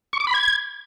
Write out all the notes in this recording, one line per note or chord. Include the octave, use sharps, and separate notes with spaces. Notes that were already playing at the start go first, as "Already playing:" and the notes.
C#6
D6
B5
G#6